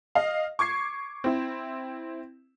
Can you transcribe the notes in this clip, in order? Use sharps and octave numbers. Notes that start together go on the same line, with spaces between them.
D#5 F5
C#6 D6 G#6 C7
C4 E4